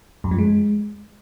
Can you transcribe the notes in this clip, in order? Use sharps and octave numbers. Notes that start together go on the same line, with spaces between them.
F#2
F3
G#3